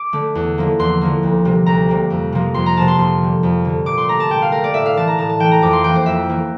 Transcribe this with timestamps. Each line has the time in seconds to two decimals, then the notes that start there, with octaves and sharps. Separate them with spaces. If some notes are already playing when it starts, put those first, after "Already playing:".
Already playing: D6
0.13 D3 A3
0.35 E2
0.58 D3 F3 A#3
0.79 E2 C6
1.01 D3 F3 A#3
1.23 D2
1.45 C3 G3 A#3
1.66 D2 A#5
1.89 C3 G3 A#3
2.10 F2
2.33 C3 F3 A#3
2.54 F2 C6
2.66 A#5
2.77 C3 F3 A#3 A5
2.88 C6
2.98 F2 C6
3.21 D3 G3
3.43 F2
3.65 D3 G3
3.86 A#2 D6
3.98 C6
4.08 A3 A#5
4.20 A5
4.30 A#2 G5
4.42 F5
4.52 A3 A#4
4.64 D5
4.74 A2 E5
4.86 F5
4.97 E3 A3 A5
5.08 A#5
5.18 A2 A5
5.29 A5
5.40 E3 A3 G5
5.51 A#5
5.62 F2 D6
5.73 C6
5.84 E3 A#3 G5
5.95 C5
6.06 F2 E5
6.29 E3 A#3